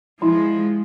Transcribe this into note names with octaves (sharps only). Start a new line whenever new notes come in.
F3 G#3 E4 C6